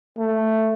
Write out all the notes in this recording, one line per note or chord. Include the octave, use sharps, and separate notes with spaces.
A3